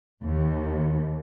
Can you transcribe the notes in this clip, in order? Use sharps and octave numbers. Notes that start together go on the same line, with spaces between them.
D#2